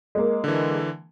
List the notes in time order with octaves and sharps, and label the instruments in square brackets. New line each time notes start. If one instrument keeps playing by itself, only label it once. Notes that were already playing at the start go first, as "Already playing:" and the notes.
[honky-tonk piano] G#3 A#3
[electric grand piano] D3 E3